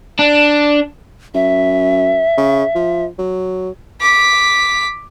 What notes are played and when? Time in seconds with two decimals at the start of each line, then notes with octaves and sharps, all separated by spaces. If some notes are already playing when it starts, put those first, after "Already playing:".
0.19 D4
1.34 F#2 E5
2.37 C#3
2.75 F3
3.18 F#3
4.01 D6 B6